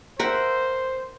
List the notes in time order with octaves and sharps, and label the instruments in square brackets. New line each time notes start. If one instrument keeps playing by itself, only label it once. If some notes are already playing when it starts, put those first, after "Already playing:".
[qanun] A#4 E5 F#5 [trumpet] C5